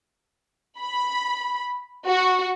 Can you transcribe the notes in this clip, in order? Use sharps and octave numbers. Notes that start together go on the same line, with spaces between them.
B5
F#4